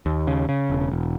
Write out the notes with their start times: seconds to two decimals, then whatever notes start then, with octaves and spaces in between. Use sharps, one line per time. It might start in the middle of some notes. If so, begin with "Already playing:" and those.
0.06 D#2
0.27 C#3
0.49 C#3
0.70 E1
0.91 E1